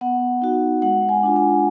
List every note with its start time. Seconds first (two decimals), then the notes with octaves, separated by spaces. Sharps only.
0.01 B3 F#5
0.42 D#4 F#4
0.82 G#3 F#5
1.09 G#5
1.23 D4 F4
1.36 G#5